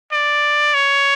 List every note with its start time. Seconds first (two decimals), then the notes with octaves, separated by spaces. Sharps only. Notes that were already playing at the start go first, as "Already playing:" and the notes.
0.12 D5
0.74 C#5